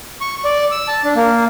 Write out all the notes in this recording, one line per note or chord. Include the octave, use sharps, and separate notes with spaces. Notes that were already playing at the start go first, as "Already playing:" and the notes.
C#6
D5
E6
A5
D4
A#3